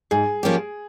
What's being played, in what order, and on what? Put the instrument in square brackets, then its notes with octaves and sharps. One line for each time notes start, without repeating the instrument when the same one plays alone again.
[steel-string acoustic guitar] G#2 [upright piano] G#4
[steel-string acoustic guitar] F3 A#3 C#4 G4